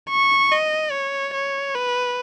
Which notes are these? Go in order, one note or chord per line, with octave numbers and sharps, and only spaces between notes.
C#6
D#5
C#5
C#5
B4